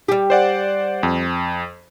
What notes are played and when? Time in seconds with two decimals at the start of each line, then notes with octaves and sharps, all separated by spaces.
0.08 G3 G4
0.30 C5 D5 F#5
1.03 F2